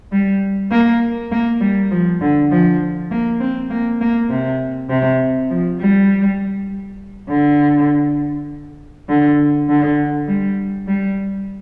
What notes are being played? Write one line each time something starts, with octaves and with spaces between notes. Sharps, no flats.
G3
A#3
A#3
G3
F3
D3
F3
A#3
C4
A#3
A#3
C3
C3
F3
G3
D3
D3
D3
G3
G3